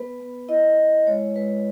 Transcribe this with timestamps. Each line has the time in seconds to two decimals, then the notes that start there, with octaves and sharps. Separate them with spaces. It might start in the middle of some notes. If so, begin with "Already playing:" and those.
Already playing: B3 B4
0.20 B3
0.49 E4 D#5
0.78 E4
1.07 G#3 C#5
1.36 G#3 B4